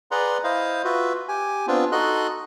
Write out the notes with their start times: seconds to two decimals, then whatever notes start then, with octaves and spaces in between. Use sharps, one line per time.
0.11 G#4 B4 D5 F#5 A#5 C6
0.44 E4 C5 D#5 F5
0.84 F4 F#4 B4 E5
1.28 G4 G#5
1.67 B3 C4 D4 F4
1.92 D#4 F#4 A4 D#5 C6 F#6